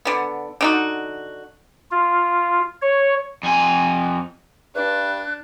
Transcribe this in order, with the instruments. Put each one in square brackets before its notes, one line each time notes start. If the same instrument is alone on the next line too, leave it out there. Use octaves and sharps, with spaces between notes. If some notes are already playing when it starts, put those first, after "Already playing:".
[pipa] D3 B3
D3 D#4 F#4
[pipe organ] F4
C#5
[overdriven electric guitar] F2 G#5
[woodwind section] G2 [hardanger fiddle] D4 [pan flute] F#6